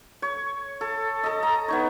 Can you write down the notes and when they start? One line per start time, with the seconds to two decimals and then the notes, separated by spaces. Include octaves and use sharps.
0.22 C#5
0.81 A4
1.24 A4 D#5
1.43 A#5
1.68 B3 D#4 C#5